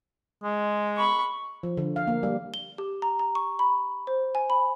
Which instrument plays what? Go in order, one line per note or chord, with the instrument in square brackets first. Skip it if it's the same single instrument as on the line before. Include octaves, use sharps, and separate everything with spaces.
[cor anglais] G#3
[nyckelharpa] B5 C#6
[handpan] F3
D3
F5
A#3
G3
[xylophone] G7
G4
A#5
A#5
C#6
B5
C5
G#5
B5